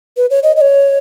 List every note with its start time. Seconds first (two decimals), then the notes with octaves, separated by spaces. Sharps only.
0.17 B4
0.31 C#5
0.43 D#5
0.57 D#5
0.61 C#5